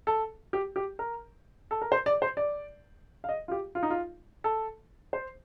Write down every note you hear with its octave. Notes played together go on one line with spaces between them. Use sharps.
A4
G4
G4
A#4
A4
A#4
C5
D5
C5
D5
F5
D#5
F4
G4
F4
D#4
F4
A4
C5